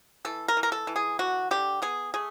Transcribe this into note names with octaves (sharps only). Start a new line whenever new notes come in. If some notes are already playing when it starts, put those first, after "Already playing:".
E3 A4
A#4
E3
A#4
A4
E3
G#4
D3 F#4
D3 G4
B3 G#4
A3 G#4